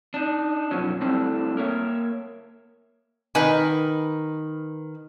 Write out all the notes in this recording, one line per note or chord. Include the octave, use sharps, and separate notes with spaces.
D4 D#4
F#2 B2 F3 F#3 C#4
G3 A3 C4 D4 E4 A4
A#3 A#4 C#5 E5
D#3 B4 G#5